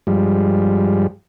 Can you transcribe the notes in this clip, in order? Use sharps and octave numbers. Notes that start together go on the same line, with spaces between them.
G2 F3 G3 G#3